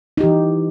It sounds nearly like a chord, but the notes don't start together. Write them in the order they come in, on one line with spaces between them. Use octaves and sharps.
D#4 G4 E3